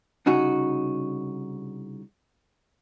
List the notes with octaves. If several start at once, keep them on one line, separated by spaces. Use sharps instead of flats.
C2 C#3 D#4 F#4